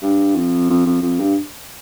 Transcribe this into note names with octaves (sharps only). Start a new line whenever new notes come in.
G2
F2
F2
F2
F2
G2